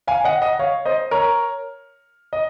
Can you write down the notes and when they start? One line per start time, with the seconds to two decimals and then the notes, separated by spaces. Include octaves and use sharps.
0.07 F5 G#5
0.24 D#5 F#5
0.42 D#5 F#5
0.59 C#5 F5
0.85 C5 D#5
1.11 A#4 C#5
2.33 D#5